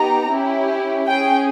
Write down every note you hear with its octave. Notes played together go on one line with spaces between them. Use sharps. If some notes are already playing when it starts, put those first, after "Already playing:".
Already playing: B3 D#4 G4 A#5
C#4 E4 G4
C#4 G#4 G5